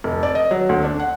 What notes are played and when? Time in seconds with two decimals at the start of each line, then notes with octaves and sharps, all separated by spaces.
0.04 F1
0.23 D5
0.35 D#5
0.51 F#3
0.69 D2
0.84 D4
1.00 F#5